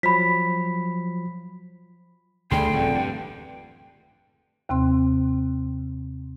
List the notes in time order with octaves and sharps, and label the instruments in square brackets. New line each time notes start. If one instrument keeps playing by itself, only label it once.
[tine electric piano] F3 F#3 [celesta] B5 B6
[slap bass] D2 D3 A3 [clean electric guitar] G3 G#4 C6 [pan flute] G5
[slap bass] D#1 A3 [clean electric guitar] F2 D3
[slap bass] G2
[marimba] D#2 C3 C4 C6